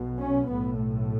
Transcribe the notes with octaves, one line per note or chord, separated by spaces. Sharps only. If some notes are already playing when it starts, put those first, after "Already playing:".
Already playing: B1 B2
C#4
B1 A2 B3
A3